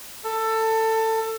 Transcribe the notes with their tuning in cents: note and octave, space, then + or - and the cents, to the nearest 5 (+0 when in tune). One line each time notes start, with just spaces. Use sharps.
A4 +20